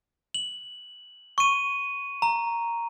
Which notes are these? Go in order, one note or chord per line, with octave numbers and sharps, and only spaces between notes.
F#7
C#6 D#7
A#5